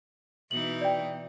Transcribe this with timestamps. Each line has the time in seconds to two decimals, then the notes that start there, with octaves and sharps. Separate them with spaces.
0.51 B2 E3 D#4 F#7
0.81 D5 G5